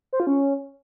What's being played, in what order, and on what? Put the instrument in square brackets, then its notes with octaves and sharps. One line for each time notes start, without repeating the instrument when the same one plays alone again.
[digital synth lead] C5
F4
C#4